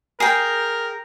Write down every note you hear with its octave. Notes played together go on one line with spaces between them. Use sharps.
G#4 A#4 G5